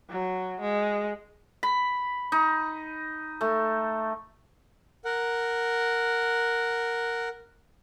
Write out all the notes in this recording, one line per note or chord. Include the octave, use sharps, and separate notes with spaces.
F#3
G#3
B5
D#4
A3
A#4 F#5